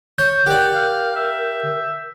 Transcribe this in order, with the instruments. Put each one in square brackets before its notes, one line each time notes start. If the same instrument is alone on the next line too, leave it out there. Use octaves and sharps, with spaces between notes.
[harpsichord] C#5 [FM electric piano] G6
[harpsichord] G4 D5 [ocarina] A#4 [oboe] F#5
[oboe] F5
E5